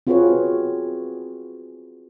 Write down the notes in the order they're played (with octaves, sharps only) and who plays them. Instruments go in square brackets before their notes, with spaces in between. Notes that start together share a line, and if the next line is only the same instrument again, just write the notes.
[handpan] C4 F4 F#4 G#4 B4 C#5